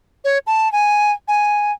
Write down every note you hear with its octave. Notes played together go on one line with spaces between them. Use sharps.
C#5
A5
G#5
G#5